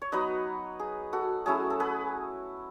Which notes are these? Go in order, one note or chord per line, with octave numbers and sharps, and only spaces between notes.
C#5
F#3 B3 D#4 B4 D#5
G#4
F#4 A4
F#3 A3 C#4 E4 G#4
A4
G#4 B4